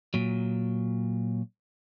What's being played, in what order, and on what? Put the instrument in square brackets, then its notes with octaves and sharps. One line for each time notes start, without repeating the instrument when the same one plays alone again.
[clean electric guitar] A#2 F#3